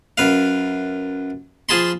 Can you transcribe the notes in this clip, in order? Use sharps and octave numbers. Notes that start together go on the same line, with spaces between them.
F#2 B4 F5
F3 G#4 A5 B5 C6